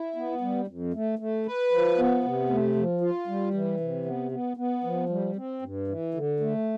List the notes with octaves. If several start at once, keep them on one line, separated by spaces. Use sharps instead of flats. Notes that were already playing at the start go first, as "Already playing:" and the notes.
Already playing: E4
B3
G3
F2
A3
A3
B4
F3
B3
C3
A3
F3
F4
G3
E3
C3
B3
B3
B3
F3
G3
C4
G2
E3
D3
A3